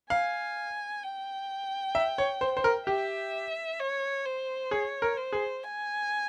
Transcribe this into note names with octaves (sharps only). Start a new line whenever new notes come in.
F5 G#5
G5
E5
C#5
C5
C5
A#4
G4 E5
C#5
C5
G#4 C#5
A#4
C5
G#4
G#5